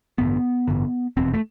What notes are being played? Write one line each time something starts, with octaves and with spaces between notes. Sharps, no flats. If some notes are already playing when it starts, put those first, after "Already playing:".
A1 G2 D3 B3
A1 G2 D3
F1 E2 B2 C4
A3